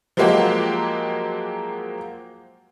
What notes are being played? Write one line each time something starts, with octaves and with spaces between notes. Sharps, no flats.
F3 F#3 G#3 A#3 F#4 G4